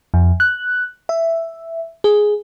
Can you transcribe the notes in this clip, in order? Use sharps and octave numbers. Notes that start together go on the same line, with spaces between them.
F2
F#6
E5
G#4